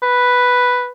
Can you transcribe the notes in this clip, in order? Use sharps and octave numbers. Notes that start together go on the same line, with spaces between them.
B4